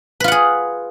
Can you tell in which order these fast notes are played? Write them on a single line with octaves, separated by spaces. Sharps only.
B4 F4 F#5 G#4